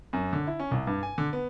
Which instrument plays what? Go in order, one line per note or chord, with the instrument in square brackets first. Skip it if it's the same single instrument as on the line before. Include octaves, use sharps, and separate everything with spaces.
[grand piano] F#2
D3
E4
C#4
C2
G2
G#5
D3
B3